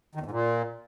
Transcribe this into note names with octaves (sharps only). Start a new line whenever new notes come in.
D#3
E2
G#2
A#2